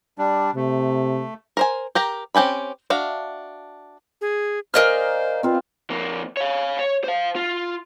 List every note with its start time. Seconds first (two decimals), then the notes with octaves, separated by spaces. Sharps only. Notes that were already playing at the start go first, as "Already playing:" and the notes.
0.18 G3 D4
0.56 C3 A3
1.57 A#4 C5 G#5
1.95 G4 A#4 A#5
2.35 C4 C#4 G4 G#5 B5
2.90 D4 F#4 E5 F5
4.21 G#4
4.74 A#4 C5 D5 D#5 F5 G#5 F6
5.43 C4 F4 B4
5.90 F2 A#3
6.37 C#5 F5
6.79 C#5
7.04 C5 F5
7.36 F4